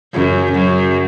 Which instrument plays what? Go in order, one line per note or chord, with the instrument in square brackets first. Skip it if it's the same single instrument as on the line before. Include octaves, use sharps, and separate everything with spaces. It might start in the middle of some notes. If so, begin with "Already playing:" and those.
[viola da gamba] F#2 [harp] C#3
[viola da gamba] F#2 [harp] F#3